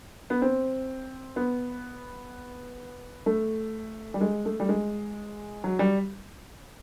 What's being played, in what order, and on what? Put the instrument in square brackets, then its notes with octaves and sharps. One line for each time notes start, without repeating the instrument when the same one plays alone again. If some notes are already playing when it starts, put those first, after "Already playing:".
[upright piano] B3
C4
B3
A3
G3
G#3
A3
G3
G#3
F#3
G3